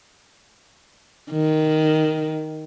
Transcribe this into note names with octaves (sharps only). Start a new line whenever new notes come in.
D#3